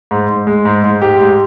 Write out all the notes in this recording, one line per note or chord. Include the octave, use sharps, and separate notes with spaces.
G#2
G#2
G#3
G#2
G#2
G#2 G4
G#2